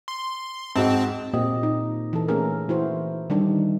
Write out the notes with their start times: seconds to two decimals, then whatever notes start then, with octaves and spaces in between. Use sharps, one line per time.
0.08 C6
0.76 G#2 C4 F#4 A5
1.33 A#2 A#3 C4 G4 D#5
1.63 D#4
2.13 E3 A4
2.28 A3 A#3 C#4 G#4 A#4
2.69 E3 E4 F#4 C5
3.30 D#3 G3 D4 D#4